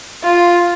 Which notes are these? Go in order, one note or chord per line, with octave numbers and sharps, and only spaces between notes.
F4